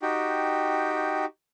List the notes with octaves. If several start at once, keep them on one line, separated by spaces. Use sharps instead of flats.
D#4 F#4 G4 G5